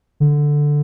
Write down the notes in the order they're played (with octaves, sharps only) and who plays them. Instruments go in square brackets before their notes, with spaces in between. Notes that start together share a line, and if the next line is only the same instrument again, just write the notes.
[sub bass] D3